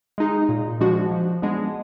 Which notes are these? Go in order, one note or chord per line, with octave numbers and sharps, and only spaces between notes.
G#3 D#4 G#4
A#2
F3 G#3 D4 F#4
F3
G#3 B3 D4